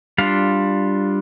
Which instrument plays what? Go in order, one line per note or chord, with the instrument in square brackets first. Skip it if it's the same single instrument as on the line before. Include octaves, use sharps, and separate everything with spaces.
[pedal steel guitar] G3 D4 F4 F5